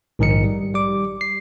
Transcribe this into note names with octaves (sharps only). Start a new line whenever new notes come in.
A#1 G#2 D#3 D#4 C#7
G3
G3 D6
C7